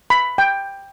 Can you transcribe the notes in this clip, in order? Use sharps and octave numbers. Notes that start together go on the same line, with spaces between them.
B5
G5